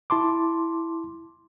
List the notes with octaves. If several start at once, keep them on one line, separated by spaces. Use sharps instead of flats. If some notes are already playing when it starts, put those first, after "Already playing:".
E4 A5 C6 D6